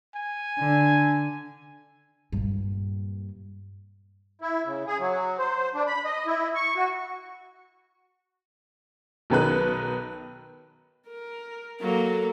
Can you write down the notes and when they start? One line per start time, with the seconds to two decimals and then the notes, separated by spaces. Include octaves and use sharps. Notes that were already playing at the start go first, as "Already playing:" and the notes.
0.15 G#5
0.58 D3
2.32 G2 A#2
4.42 E4
4.66 C#3
4.87 G#4
4.99 F#3
5.38 C5
5.74 D4
5.87 B5
6.05 D#5
6.27 E4
6.55 C#6
6.76 F#4
9.30 B1 D#3 B4 F#6
11.07 A#4
11.81 F#3 A#3 A4